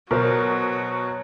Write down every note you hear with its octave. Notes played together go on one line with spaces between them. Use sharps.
B2 F#3 A#4 C5